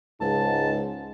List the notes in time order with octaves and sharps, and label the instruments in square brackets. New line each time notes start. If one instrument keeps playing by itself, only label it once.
[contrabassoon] C#2 [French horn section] G#2 G#3 [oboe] A5